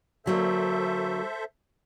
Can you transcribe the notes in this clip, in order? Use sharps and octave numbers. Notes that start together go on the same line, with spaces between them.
D3 F#3 A#3 A4 C5 E5